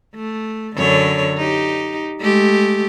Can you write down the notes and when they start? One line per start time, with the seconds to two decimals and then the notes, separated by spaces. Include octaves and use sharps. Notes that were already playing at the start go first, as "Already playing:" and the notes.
0.16 A3
0.76 F#2 D3 C#5
1.37 D#4 G4
2.20 G#3 A3 G4